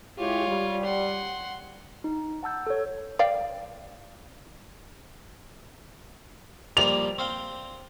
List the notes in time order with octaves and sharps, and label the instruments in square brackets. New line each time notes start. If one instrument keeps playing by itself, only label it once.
[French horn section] G#3 E4 G4 [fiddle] F4 C#5
[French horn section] G3
[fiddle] F#5 C6
[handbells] D#4
F#5 A5 E6 G6
A4 C#5
[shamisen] D5 F5 G5
[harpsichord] F3 G3 A#3 [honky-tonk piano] F7
[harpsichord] C4 F5 G5